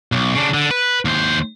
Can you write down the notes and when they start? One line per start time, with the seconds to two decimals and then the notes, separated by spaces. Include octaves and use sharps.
0.12 B1
0.35 C#3 D4
0.54 D3
0.71 B4
1.05 D#2 C5